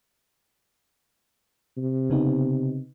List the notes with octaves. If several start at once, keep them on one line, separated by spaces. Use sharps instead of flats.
C3
C#3 B3 D#4